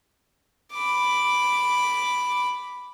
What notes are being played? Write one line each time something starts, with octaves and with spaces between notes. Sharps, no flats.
B5 D6